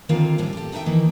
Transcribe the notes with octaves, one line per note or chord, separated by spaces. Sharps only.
D3 D#3 A#3 C4 F4 F5
D#2 A2 G3 C#4
G4 A4
D2 D4 D#4 C#5 E5 G5
D#3 E3 A#3